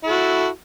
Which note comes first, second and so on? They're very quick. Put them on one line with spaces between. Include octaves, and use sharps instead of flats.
E4 A4 F#4